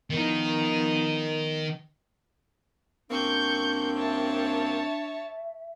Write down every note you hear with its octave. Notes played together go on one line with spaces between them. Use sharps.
D#3 F3 B3 D#4
F#2 A#3 C4 D4 C#6 G6
C#5 E5 A5